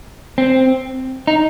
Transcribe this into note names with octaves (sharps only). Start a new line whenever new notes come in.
C4
D#4